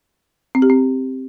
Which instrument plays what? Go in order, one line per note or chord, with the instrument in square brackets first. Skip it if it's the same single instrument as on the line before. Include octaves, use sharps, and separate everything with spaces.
[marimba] C4
G4
C4